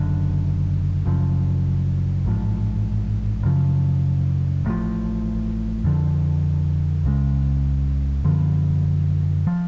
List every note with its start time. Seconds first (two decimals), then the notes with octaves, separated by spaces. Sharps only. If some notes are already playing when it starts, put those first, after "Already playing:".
Already playing: F#1 F#2 D3
1.06 F#1 F#2 C#3 F3
2.25 A1 G#2 F3
3.45 F#2 C#3 F3
4.65 A1 A2 F3
5.84 F2 D3 F3
7.04 C#2 C#3 G#3
8.24 F#2 D3 F3 B3
9.47 F3